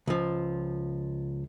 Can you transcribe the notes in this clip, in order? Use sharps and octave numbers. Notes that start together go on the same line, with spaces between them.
C#2 F3